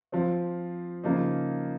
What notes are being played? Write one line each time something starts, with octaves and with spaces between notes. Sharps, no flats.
F3 C4 F4
C#3 F3 A#3 D#4